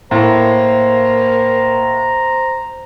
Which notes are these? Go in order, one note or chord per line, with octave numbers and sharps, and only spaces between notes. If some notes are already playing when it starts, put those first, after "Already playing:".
A2 A#3 C5 A#5